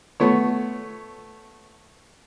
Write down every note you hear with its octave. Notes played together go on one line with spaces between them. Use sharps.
A3 B3 C#5